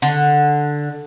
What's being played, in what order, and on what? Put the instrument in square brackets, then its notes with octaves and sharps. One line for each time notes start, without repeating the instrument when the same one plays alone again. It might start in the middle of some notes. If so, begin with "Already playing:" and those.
[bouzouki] D3